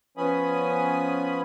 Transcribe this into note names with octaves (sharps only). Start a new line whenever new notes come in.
F3 B3 C#4 G#5 B5 D#6